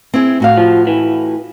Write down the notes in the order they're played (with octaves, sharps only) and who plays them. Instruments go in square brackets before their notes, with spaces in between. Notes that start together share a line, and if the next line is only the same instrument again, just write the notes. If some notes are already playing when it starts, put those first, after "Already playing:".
[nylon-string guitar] C4 E4 G#4
A2 F#4 F5
[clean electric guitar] F3
E3